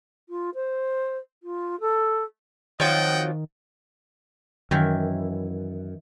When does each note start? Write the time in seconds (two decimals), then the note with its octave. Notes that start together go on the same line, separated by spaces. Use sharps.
0.29 F4
0.55 C5
1.43 F4
1.80 A4
2.80 D#3 F3 F#3 C4 D#5 F#5 G5
4.71 F#2 D#3 E3 E4